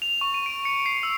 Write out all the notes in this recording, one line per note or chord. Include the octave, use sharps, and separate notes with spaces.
F7
C#6
D#7
D7
C#7
C7
E6